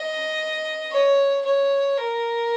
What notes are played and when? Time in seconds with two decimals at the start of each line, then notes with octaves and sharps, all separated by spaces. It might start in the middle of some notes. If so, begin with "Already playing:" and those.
Already playing: D#5
0.91 C#5
1.45 C#5
1.98 A#4